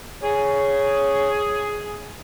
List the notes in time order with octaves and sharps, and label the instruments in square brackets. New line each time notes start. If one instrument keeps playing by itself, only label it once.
[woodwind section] G#4 [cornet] C#5